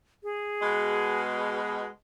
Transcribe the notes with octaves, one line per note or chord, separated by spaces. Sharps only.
G#4
B2 G#3